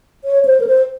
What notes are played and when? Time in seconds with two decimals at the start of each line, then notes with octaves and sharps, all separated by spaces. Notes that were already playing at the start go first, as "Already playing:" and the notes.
0.24 C#5
0.45 C5
0.60 A#4
0.67 C5